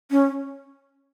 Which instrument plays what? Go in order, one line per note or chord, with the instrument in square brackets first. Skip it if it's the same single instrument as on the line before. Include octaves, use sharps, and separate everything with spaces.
[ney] C#4